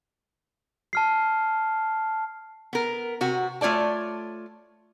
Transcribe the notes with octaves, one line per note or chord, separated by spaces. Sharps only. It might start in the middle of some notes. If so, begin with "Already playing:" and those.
A5 F6 C7
B3 A#4
C3 F#4
A3 F4 C#5 D5 A5